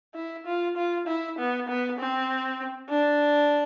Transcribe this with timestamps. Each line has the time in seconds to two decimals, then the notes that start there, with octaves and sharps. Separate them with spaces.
0.15 E4
0.46 F4
0.76 F4
1.07 E4
1.38 B3
1.68 B3
1.98 C4
2.90 D4